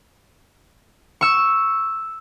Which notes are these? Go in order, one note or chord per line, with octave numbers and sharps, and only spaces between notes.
C#6 E6